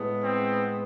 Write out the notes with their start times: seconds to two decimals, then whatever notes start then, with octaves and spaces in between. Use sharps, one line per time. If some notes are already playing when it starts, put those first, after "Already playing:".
Already playing: A2 G#3 B3
0.24 C4